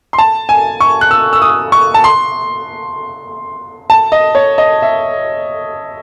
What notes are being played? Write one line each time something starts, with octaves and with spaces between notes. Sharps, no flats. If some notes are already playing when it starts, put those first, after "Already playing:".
C6
A5
G#5
C#6
F#6
E6
E6
D#6
C#6
A5
C6
A5
D#5
C#5
D#5
E5